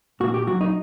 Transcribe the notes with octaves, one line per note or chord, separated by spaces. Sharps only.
A#2 F#4
G4
F#3 F#4
D#4